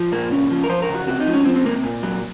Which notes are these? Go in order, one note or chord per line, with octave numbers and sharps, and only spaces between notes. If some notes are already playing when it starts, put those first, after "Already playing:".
Already playing: F3
A#2 A#3
C#3 C#4
F3
A#4
F3 C5
A#4
C#3
F#4
C3 F#4
D#4
F3
C#4
F3 C4
C4
C3 A#3
A#2
F#3